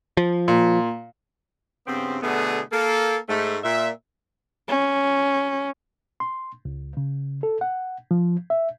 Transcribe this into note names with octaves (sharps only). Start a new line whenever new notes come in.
F3
A#2
G2 C#3 B3 C4
B2 D3 A3 B3 D4 G#4
A#3 A4
G#2 A3
A#2 E5
C#4
C6
C#2
C#3
A4
F#5
F3
E5